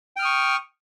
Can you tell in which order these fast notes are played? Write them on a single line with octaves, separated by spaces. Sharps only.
G5 F6 D#6 C#6